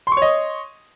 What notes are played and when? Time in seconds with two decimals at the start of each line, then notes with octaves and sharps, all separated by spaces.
0.07 C6
0.12 C#6
0.17 C#5
0.22 D#5